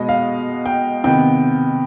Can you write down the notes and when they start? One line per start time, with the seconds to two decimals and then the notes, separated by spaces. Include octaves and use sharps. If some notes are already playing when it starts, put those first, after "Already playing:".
Already playing: B2 G#3 B3 D#5
0.09 F5
0.66 G5
1.04 C3 D#3 B3 G5